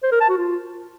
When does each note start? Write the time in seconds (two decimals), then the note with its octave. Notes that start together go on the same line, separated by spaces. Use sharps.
0.03 C5
0.12 A#4
0.20 A5
0.29 F#4
0.38 F4